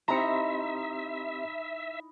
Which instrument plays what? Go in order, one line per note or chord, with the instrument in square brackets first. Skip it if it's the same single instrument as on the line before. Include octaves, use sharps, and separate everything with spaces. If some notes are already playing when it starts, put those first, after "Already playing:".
[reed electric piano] C4 G4 C6 [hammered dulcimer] D#4 E4 [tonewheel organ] E5 [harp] A#5 C#7